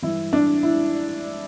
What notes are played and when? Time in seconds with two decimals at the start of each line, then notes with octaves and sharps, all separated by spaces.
0.02 G2 E3 E4
0.33 D4
0.63 E4